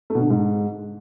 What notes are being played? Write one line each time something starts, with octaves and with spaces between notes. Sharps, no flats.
A3
B2
D3
C3
G#2